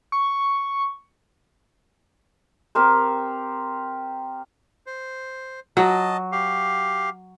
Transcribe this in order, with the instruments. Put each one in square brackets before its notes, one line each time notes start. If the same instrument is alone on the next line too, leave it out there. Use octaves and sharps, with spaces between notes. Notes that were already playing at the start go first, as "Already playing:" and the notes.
[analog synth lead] C#6
[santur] C4 G4 A#4 C5
[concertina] C5
[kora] F#3 [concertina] D#5 A5
[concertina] G4 F5